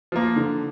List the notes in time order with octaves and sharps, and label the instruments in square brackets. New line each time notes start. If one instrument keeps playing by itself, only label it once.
[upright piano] F3 A#3
D3